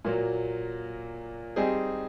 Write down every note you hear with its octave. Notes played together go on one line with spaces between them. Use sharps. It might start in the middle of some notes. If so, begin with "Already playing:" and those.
A#2 F#3 A#3
G3 C4 D#4 G#4